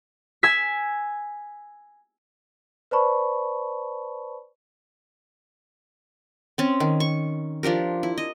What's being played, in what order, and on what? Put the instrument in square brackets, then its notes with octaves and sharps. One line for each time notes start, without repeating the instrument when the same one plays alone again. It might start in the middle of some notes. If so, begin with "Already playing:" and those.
[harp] G#5 E6 G#6 B6
[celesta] B4 C5 D5 A5 B5 C#6
[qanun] C4 C#4
D#3
C#6
F3 D4 G4 A#4
E4
D#5